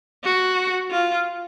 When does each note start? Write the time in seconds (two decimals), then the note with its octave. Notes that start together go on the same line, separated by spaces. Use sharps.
0.24 F#4
0.91 F4